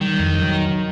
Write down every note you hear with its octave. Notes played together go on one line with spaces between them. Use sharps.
D#3 G3
F2
F#3